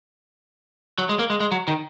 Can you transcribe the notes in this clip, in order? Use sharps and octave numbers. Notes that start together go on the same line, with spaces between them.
F#3
G#3
A#3
G#3
G#3
F#3
D#3